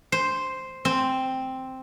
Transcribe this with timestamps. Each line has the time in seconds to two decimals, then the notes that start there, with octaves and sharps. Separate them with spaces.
0.12 C5
0.85 C4